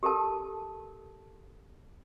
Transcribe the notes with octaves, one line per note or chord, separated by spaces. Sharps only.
G4 A4 A#4 A5